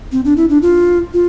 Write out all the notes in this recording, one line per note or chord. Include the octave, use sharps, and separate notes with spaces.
C4
D4
E4
D4
F4
F4